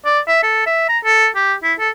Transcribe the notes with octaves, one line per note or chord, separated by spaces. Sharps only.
D5
E5
A4
E5
A#5
A4
G4
E4
A4